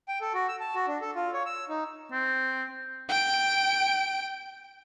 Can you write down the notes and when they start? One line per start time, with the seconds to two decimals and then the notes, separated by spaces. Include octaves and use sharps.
0.08 G5
0.21 A4
0.34 F#4
0.49 E6
0.60 A5
0.75 F#4
0.88 D4
1.01 A4
1.15 F4
1.34 C#5
1.46 E6
1.69 D#4
2.12 C4
3.09 G5 D7